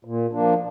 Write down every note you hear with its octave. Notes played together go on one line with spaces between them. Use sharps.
A#2
F3 A#3 D4